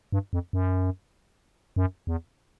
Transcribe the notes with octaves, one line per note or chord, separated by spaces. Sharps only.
G2
F2
F#2
F#2
E2